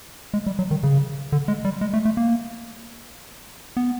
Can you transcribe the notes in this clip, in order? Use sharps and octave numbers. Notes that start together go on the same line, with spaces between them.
G#3
G3
F#3
D#3
C#3
D3
G#3
G3
G#3
A3
A3
A#3
B3